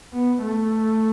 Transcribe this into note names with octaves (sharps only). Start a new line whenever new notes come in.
B3
A3